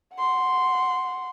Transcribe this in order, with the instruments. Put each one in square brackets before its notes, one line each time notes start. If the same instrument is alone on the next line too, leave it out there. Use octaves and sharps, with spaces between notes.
[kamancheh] F#5 C6